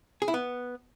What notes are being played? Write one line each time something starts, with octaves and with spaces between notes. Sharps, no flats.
G#4
E4
B3